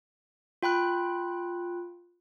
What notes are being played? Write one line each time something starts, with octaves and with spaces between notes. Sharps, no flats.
F4 G5 B5 F#6